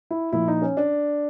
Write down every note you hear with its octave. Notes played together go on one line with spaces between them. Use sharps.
E4
A#2 F3 E4
D#4
C#4
D4